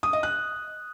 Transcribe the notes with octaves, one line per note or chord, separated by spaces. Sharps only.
D#6
D#5
F#6